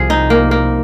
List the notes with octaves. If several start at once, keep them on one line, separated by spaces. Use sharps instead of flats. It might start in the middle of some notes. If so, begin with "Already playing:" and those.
Already playing: C2 C3 F3 G#4
D#4
A#3
A#3